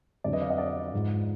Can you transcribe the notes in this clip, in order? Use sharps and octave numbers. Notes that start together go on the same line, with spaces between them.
F2 D3 F#3 D5
B4 D#5
D5 F5
D#5 F#5
D5
G#2 F3